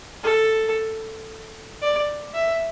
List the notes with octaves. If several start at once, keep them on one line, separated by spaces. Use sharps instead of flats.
A4
D5
E5